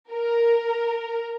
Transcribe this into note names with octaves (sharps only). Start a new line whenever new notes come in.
A#4